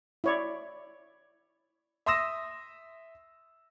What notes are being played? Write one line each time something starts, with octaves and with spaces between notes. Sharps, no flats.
E4 C#5 D5
E5 C6 D#6 E6 A#6 E7